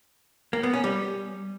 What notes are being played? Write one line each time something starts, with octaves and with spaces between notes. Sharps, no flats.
A#3
B3
C#4
G3